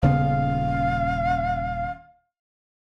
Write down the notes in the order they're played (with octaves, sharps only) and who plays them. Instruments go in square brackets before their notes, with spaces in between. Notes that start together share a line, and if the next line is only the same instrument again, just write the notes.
[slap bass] D#1 C#3 B3 [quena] F5